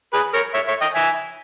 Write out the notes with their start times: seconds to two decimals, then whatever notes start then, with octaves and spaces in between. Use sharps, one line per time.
0.13 G#4 B4
0.34 A#4 C#5
0.54 C#5 E5
0.68 C#5 E5
0.81 D#5 G5
0.95 E5 G#5